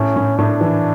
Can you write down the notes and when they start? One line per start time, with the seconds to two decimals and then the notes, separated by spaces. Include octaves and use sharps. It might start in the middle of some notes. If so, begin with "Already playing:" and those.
Already playing: A2 C#4
0.16 A2
0.38 A2 D4
0.61 E3